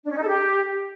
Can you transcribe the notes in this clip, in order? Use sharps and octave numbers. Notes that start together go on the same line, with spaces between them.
D4
C#4
D#4
A4
G4